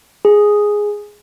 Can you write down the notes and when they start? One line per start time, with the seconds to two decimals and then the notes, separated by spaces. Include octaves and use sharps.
0.25 G#4